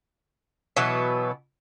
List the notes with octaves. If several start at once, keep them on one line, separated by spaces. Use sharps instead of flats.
B2 E3 F#3 B3